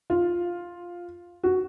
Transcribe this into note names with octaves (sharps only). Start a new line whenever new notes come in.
F4
F#4